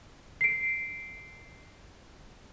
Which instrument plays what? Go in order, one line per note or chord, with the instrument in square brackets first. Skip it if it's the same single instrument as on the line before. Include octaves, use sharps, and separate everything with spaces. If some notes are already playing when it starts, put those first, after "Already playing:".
[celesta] C7 D7